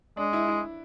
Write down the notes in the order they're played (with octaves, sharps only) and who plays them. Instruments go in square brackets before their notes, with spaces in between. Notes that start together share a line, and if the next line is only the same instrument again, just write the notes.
[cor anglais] G#3 [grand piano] D4
[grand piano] E4
E4